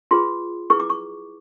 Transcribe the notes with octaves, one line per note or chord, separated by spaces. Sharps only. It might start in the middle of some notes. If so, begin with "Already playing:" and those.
F4 G#4 B4 C6
E4 G#4 B4 C#6
D6
C#6